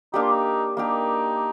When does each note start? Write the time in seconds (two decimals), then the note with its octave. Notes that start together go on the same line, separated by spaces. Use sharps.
0.14 A#3 D4 D#4 G4
0.22 F4
0.31 D#4
0.77 A#3 D4 D#4 G4